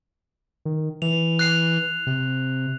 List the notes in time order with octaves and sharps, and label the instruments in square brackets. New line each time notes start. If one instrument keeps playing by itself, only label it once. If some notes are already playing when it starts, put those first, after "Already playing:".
[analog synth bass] D#3
[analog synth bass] E3 [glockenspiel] F7
[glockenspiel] F#6 C7 F7
[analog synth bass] C3